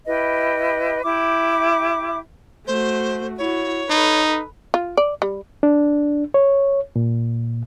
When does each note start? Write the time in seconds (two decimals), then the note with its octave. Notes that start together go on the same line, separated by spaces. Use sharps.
0.06 E4 G4 B4 D#5
1.03 E4 G4 E5 D6
2.67 A3 F#4 C5
3.38 E4 F#4 C#5
3.90 D#4 A4 B4
4.74 F4
4.97 D5
5.22 G3
5.63 D4
6.34 C#5
6.96 A#2